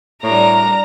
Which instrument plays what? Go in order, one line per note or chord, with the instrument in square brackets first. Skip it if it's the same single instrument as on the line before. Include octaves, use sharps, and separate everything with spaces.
[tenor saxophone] A2 [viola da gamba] G3 D4 A#4 [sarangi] A#5